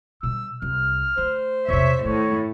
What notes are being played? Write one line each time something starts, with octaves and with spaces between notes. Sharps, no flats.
B2 G3 E6
C2 F6
A3 C5
E2 C3 C#5 E5
A2 D#3 C#5